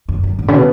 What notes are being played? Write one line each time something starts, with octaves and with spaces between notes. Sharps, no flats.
F#2
F#2
G#2
C#3
B2